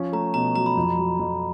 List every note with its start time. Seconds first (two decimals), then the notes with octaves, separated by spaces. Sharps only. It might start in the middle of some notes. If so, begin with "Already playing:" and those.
Already playing: F3 C#4
0.13 A3 A#5
0.34 B2 A#5
0.55 F#3 A#5
0.66 B5
0.77 F2
0.98 F#3
1.19 F2